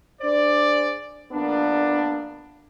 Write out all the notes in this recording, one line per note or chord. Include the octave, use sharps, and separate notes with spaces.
D4 G#4 C5 D5
A#1 A#3 B3 D4